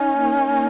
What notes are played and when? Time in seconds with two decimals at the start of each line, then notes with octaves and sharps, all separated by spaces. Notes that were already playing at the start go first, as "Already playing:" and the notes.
Already playing: C#4 D#4
0.08 A#3